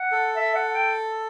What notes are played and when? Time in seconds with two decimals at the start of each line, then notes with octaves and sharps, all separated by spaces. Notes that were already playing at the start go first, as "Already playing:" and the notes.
Already playing: F#5
0.12 A4
0.36 E5
0.55 F#5
0.66 F#5
0.74 G5